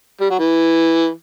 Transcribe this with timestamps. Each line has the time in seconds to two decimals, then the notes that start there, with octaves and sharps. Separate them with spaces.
0.21 G3
0.30 F#3
0.39 E3